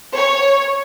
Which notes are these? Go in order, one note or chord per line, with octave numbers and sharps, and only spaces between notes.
C#5